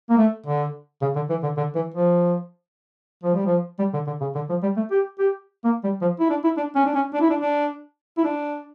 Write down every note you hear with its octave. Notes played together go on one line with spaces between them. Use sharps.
A#3
A3
D3
C#3
D3
E3
D3
D3
E3
F3
F3
G3
F3
G3
D3
D3
C#3
D3
F3
G3
A3
G4
G4
A#3
G3
F3
E4
D4
E4
D4
C#4
D4
C#4
D4
E4
D4
D4
E4
D4